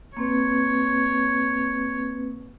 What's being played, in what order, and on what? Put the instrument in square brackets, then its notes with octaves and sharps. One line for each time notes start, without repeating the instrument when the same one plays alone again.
[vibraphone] A#3 C4 B4 [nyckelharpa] C#5